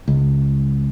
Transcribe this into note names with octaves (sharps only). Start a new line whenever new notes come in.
C#2